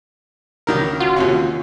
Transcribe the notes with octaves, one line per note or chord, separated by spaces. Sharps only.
C#2 D#3 A#4
F4 F#4
D#2 C3 C#4